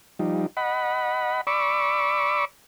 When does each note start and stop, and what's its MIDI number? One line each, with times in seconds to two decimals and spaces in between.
0.19 0.46 53
0.19 0.46 55
0.19 0.46 63
0.57 1.41 75
0.57 1.41 78
0.57 1.41 83
1.47 2.45 74
1.47 2.45 83
1.47 2.45 85
1.47 2.45 86
1.47 2.45 88